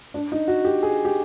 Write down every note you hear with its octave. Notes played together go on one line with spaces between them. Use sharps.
D4
D#4
F#4
G4
G#4
G4